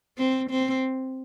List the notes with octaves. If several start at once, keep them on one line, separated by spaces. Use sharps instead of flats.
C4
C4